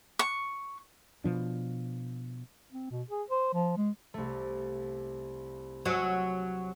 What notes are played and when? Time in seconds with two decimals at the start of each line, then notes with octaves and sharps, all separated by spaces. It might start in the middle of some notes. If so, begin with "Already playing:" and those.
0.19 C#6
1.24 B2 F3 D4
2.72 C4
2.91 B2
3.10 G#4
3.30 C5
3.54 F3
3.77 G#3
4.14 C2 A3
5.85 F#3 F#5 G#5 E6